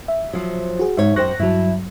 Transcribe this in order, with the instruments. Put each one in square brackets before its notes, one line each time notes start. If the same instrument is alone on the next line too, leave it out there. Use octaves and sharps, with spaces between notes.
[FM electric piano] E5
[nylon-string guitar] F3 F#3
[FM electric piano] F#4 G#4
[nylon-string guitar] G#2 C#5 [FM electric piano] E5
[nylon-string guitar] F#2 C5 G5 [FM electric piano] C#6 F#6 A#6
[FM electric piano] G2 F#3 [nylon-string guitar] E4 A5